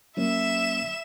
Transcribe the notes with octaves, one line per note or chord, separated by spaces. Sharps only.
F#3 A#3 C#4 E5 E7